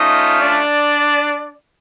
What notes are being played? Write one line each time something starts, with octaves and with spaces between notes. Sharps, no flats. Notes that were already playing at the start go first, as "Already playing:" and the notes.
Already playing: A3 C#4 D#4 F4 D#5
D4 D5